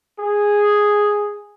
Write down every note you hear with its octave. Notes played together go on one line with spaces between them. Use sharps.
G#4